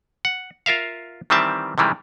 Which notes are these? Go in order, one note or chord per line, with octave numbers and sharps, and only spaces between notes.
F#5
F4 A#4 E5 F5
D#3 E3 G3 C4 E5 A5
C3 D#3 E3 G3 G#3